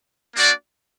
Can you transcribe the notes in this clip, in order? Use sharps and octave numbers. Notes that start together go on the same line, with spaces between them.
A#3 D4 F#4 D5